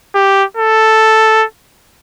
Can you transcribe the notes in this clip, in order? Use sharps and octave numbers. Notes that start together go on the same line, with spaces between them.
G4
A4